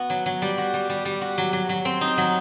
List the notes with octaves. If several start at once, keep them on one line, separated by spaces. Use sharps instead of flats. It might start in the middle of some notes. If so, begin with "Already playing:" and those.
Already playing: B3 F#4
F#3
F#3
G3
F#4
G3
G3
G3
F#4
F#3
F#3
F#3
C4
D#4
F#3